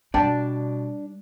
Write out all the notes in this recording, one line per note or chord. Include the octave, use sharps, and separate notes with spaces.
B2 G3 D4 D5 G5 A5